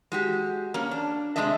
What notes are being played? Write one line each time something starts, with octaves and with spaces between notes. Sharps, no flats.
G#3 F#4 G4
A#3 C#4
D4
C3 G3 G#3 D4 D#5 E5